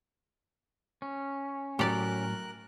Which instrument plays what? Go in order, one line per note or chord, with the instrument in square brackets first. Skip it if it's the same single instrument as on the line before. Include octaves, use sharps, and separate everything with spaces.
[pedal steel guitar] C#4
[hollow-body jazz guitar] A2 F#3 [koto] G4 D5 [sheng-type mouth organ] A#4 F#6